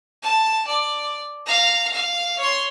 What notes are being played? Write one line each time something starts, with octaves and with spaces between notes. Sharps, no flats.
A5
D5
F5 A#5
F5
C#5 C6